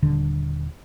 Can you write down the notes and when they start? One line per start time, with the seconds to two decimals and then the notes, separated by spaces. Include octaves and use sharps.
0.02 D#1 D3